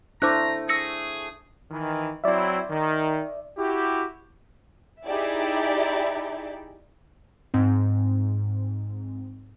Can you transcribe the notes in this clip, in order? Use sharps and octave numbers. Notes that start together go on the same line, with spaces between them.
A3 D4 E4 C5 A#5 D6 F#6
G#4 E6 A#6 C#7
D#3 E3
F#3 C4 E4 D5 E5
D#3
E4 F#4 G4
D#4 E4 G4 G#4 D5 E5
G#2 C4